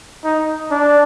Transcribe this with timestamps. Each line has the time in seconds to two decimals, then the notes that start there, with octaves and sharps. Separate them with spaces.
0.25 D#4
0.71 D4